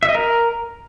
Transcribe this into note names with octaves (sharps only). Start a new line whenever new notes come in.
E5
D#5
A#4